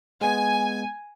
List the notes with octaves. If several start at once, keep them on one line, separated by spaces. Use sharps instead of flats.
G#3 B3 G#5